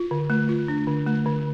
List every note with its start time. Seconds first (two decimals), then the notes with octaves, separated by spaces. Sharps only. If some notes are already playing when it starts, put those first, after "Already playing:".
Already playing: F4
0.11 D3
0.30 A3
0.49 F4
0.68 D4
0.87 D3
1.06 A3
1.26 D3